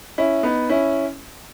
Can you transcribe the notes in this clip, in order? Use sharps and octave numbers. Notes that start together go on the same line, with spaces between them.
C#4 E4
B3 D#4
C#4 E4